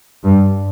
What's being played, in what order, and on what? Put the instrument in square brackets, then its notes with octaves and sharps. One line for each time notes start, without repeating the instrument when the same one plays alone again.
[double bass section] G2